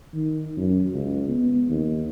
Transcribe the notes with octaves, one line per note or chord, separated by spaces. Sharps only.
D#3
F#2
C#2
B3
D#2